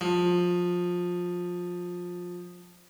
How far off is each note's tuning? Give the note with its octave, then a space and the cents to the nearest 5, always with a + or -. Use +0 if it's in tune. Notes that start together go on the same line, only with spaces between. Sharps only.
F3 +20